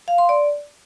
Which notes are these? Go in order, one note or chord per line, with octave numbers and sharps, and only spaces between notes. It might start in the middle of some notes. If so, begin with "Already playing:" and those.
F5
C6
D5